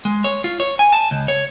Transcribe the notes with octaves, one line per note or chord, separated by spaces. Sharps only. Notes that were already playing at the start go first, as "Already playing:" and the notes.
G#3
C#5
F4
C#5
G#5
A5
C#2
C#5